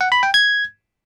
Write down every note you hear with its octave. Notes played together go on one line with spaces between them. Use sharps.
F#5
B5
G5
G#6